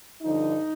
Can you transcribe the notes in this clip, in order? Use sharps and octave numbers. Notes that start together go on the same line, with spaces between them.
G2 D3 F3 D#4